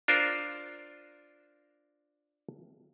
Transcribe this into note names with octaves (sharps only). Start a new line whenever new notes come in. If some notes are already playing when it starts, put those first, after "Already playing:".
D4 F4 A#4 C5